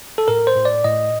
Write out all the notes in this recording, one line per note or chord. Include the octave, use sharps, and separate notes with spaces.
A4
A2 A#4
C5
A2
D5
A2 D#5